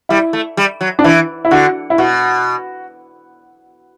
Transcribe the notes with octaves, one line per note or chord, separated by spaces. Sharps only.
G3 E4
A3
G3
F#3
D4
E3 E4
E4
D3 F#4
E4
B2 F#4